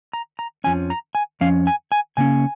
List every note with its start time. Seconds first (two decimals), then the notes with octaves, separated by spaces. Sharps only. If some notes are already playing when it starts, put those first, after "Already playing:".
0.13 A#5
0.39 A#5
0.64 F2 F3 C#4 G#5
0.90 A#5
1.15 G#5
1.41 F2 F3 C#4 F5
1.67 G#5
1.92 G#5
2.17 C#3 A#3 C#4 G#5